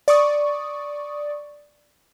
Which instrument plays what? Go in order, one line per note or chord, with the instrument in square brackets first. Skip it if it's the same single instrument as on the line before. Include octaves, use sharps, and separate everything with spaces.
[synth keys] D5 C#6 D#6